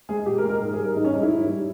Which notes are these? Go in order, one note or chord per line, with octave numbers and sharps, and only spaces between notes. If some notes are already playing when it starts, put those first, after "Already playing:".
G#3 G#4
A#2 G4
A#4
G#3
A#4
G#2
G#4
G3
A#4
G#2 D#4
C#4
G3 D#4
E4
G#2
G3